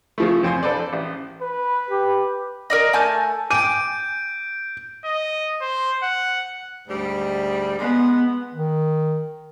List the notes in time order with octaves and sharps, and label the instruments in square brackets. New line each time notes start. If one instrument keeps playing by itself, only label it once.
[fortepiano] C#3 F3 A3
F2 C4 G#5 C6
D4 A4 B4 C5 D5
A1
[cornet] B4
[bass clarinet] G4
[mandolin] A#4 D5 D#5
A3 G#5 A5 G6
[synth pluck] G5 G#5 [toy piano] D6 [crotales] G6 D7 [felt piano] D#7
[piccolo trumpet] D#5
C5
F#5
[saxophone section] D2 G#2 G3
[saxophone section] G#3 [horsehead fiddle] B3 F#5
[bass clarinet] D#3